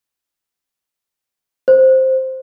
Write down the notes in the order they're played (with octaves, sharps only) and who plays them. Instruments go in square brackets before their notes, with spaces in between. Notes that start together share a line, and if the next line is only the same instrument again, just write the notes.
[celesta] C5